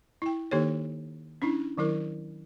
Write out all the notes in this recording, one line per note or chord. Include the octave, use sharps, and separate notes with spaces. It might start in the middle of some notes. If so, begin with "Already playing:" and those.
E4 G5
D#3 A#3 D#4 G4 A4 C#5
C#4 D4 E4
D#3 F#3 E4 A#4